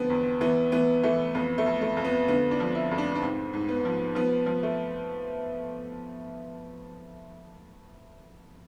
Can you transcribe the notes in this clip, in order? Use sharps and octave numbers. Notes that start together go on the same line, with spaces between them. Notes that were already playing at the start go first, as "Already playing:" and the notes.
Already playing: D3 F3 B3 C4
E2
E3 B3
E3 B3
E3 A3
F2 B3
A3
F2
A3
F2
B3
D3 B3
D4
F3
E4
F2
D4
D4
G#2 C4
G#2
B3
F3
F3 B3
F3
A3